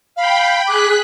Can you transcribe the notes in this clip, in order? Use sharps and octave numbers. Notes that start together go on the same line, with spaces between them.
F5 G5 B5
G#4 D6 F#6 B6